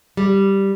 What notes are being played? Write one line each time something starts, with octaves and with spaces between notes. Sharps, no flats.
G3